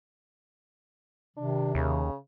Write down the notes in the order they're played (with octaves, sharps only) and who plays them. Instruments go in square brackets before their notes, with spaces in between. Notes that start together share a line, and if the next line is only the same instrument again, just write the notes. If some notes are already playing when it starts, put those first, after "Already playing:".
[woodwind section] C3 D#3 [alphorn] D4
[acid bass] D#2 [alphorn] C#3